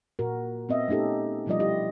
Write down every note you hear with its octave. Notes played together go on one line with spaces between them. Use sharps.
A#2 F#4 A#4
B3 C4 D#5 E5
A3 C#4 D#4 G4 A4
B2 F3 G3 F4 D5 D#5
E4 G4 D#5